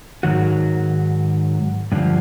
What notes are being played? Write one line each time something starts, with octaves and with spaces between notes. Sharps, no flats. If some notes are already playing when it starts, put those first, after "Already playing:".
G#2 D#3 F#3 F#4
G2 D3 F3